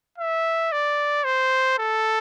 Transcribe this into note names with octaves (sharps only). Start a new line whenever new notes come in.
E5
D5
C5
A4